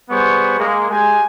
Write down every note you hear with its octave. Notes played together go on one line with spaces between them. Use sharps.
G3 B3 G#4 C5 C#6
G#3 A#3
G#3 G4 G#5